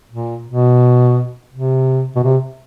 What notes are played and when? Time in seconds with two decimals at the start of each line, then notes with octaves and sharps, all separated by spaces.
0.11 A#2
0.47 B2
1.53 C3
2.16 B2
2.24 C3